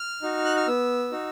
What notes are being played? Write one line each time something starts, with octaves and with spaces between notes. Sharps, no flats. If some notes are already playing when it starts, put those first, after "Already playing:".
Already playing: F6
D#4 F#4
F#6
F6
B3 E6
D#4 F#4